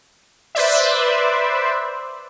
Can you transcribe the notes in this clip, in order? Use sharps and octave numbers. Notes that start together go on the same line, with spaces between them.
B4 C5 D5 E5